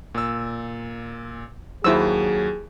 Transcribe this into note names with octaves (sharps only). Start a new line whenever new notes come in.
A#2 E6
D#2 F#3 E4 G#4 C5 E6